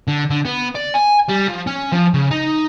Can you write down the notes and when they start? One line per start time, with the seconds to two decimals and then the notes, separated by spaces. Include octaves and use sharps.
0.08 D3
0.30 D3
0.45 B3
0.76 D5
0.95 G#5
1.29 G3
1.48 F3
1.67 C#4
1.92 F3
2.14 C#3
2.31 D#4